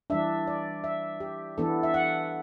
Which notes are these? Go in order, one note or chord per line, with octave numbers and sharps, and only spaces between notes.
E3 G3 D4 E5
D5
E5
G4
E3 B3 D4 A4
E5
F#5